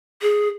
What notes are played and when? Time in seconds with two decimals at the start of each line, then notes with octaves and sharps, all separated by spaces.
0.22 G#4